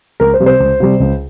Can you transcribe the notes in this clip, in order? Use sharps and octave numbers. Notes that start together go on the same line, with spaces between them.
C#2 A#4
C5
C3 G3
C5
C#2
C3 G3
C#2